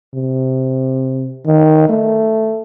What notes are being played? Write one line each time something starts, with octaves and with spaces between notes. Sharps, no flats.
C3
D#3
A3